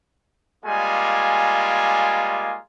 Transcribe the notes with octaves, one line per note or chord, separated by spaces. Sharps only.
G3 G#3 A#3 F4 G#5